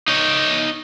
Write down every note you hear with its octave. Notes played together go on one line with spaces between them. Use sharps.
D#4 C#5